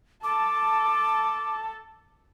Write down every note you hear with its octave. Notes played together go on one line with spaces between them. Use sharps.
A4 A5 D6